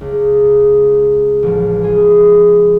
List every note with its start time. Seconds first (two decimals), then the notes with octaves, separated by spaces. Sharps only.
0.01 C#2
1.43 A1 F3
1.82 F4 G#4